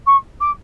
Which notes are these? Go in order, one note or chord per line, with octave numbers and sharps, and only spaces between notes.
C#6
D6